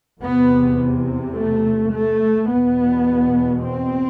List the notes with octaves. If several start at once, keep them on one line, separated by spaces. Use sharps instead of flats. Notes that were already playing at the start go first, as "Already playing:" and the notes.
E2 C3 B3
A3
A3
E2 B2 B3
C4